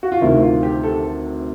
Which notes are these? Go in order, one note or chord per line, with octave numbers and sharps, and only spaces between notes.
F#4
F4
D2 C3 D#3 E4
F4
G4
A4